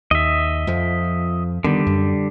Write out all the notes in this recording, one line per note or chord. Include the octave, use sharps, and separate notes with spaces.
D#2 D#5 E5
F2 F3
D3 D#3 G3 B3
F#2